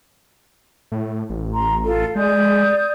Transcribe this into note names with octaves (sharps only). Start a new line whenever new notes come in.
A2
A1
A#5 C6
F4 A4
G#3 D5 D#6 G6